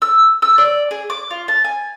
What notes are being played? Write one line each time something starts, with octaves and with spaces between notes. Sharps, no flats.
E6
E6
D5
G#4
D6
F4
A5
G#5